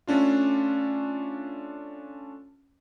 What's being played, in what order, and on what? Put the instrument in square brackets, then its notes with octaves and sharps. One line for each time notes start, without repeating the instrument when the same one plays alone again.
[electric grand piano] A3 C#4 D4 F4